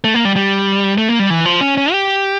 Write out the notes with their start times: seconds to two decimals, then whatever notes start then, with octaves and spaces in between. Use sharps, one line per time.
0.04 A3
0.14 A#3
0.25 G3
0.36 G3
0.98 A3
1.09 A#3
1.19 G3
1.30 E3
1.45 F3
1.61 C#4
1.77 C#4
1.92 G4